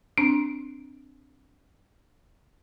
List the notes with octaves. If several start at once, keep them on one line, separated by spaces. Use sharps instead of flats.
C4 D4